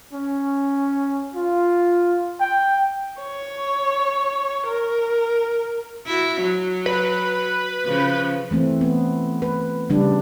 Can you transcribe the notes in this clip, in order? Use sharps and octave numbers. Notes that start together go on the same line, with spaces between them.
C#4
F4
G5
C#5
A#4
E4 F#4
F#3
B4
C#3 F3
E3 A3 C4
B3
B4
C#3 G3 D4